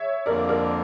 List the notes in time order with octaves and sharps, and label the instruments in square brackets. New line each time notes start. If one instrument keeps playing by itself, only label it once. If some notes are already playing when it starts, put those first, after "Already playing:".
Already playing: [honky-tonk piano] C#5 E5
[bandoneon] F2 D3 F3 A#3 [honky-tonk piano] A#4 D5
[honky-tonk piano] A#4 D5